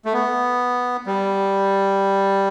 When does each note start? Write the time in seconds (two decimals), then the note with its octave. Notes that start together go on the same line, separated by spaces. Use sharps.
0.05 A3
0.13 B3
1.07 G3